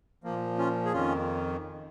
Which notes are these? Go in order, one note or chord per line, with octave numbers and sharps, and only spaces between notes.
A#2 F3 A#3
C#4 F4
G#4
F2 D#3 C#4 F4